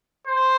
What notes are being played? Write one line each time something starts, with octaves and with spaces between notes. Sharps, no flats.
C5